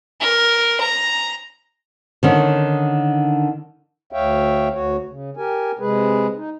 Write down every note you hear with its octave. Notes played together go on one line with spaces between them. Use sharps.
A#4
A#5
D3 D#3 C#4
D2 C#5 E5 F5 G5
D2 F#4 C#5
C#3
G4 A#4 G#5
C3 G#3 G#4 B4
D#4